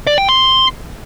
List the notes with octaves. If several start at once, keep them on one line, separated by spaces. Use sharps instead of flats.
D5
G5
C6